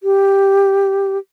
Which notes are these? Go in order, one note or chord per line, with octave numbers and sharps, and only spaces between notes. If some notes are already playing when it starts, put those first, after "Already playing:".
G4